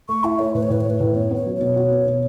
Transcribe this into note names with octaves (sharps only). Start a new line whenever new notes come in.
A3 C#6
E4 E5
A3 C#5
A2 B4
C#5
A2 B4
C#5
A3
B4
A2
B3 C#5
B3
C#5
F#3
C#5
B2
F#4
B3
B2